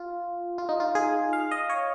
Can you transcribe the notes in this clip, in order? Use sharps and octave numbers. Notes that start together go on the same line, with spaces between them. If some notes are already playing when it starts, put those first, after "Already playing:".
Already playing: F4
F4
D#4
F4
G#4
F5
D#5
C#5